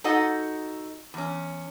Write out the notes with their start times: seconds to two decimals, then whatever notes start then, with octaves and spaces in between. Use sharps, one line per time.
0.04 D#4 F#4 A4 D#5 F#5
1.14 E2 C#4